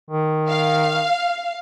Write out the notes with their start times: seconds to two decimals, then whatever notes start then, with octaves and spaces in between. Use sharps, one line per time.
0.10 D#3
0.48 F5